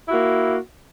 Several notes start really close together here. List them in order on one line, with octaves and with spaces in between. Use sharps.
E4 F#4 A#3